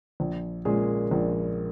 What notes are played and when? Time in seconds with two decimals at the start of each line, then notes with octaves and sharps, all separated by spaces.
0.20 A#1
0.65 A#2 G#3 C#4 G#4
1.11 A#1